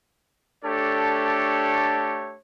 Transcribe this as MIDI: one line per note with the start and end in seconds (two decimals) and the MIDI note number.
0.64 2.37 57
0.64 2.37 62
0.64 2.37 67
0.64 2.37 69
0.64 2.37 73